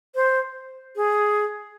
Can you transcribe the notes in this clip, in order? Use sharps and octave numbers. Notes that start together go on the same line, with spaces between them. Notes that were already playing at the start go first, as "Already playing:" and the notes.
C5
G#4